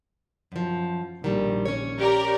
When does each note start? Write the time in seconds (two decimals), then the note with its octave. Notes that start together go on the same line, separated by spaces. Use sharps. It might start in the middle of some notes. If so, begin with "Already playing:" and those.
0.52 F#2 F3
1.24 A#1 D#3 G3
1.65 C#4 C#5
1.98 G4 A#4 D5